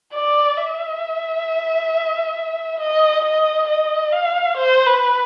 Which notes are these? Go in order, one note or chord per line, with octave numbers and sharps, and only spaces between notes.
D5
E5
D#5
D#5
D#5
F5
C5
B4